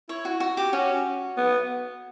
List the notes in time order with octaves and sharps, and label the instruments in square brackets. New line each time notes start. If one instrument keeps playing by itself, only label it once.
[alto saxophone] E4 [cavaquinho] C#5
[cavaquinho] F#4
F#4
G4
[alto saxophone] C#4 [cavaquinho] F#4
[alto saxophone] B3